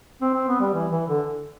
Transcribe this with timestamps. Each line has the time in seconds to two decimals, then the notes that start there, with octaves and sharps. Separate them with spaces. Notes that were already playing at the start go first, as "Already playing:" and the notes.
0.22 C4
0.34 C4
0.48 B3
0.61 G3
0.74 E3
0.91 E3
1.09 D3